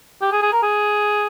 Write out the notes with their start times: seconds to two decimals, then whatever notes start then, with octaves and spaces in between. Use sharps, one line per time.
0.22 G4
0.32 G#4
0.43 G#4
0.53 A#4
0.63 G#4